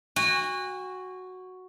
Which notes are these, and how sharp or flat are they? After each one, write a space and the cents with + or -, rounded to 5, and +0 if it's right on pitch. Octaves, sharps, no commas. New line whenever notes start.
F#4 +0 G#5 -40